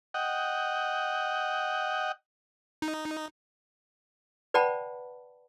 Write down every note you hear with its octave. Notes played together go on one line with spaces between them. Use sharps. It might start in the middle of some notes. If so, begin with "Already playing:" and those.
D#5 F#5 G5
D#4
B4 D5 F#5 G5 A5 B5